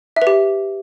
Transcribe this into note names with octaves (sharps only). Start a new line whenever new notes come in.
E5
B4
G4